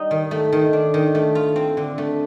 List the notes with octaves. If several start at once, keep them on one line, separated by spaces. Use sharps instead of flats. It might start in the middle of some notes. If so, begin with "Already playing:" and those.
Already playing: G3 D#4
D#3
A3
D#3
D4
D#3
A3
F4
C4
D3
A3